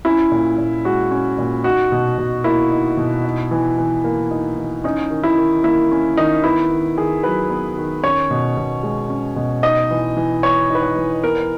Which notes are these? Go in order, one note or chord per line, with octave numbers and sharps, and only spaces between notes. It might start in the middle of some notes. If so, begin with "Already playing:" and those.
C#4 E4
A#2
A#2
G#3 F#4
C#4
A#2
D#4 F#4
B2
B2
A#3 E4
D#4
B2
D#4
E3
E3
A#3
D#4
E3
C#4 D#4
D#3
E4
D#3
A#3 E4
C#4
D#3 D#4
B3 E4
D#3
D#3 G#4
F#3 B4
B3
D#3
C#4 C#5
B2
B2
G#3
C#4
B2
D#4 D#5
E3
E3
B3 C#5
D#4
B4
C#5
E3
B3 A#4